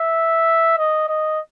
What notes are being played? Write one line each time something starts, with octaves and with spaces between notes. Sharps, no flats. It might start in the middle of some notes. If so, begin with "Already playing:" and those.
Already playing: E5
D#5
D#5